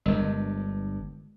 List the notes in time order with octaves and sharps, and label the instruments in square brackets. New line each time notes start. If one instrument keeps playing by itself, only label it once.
[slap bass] G1 G2 [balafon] G#3 A#4 D#5